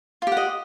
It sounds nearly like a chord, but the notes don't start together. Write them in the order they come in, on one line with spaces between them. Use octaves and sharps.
F4 G4 F#5 D#5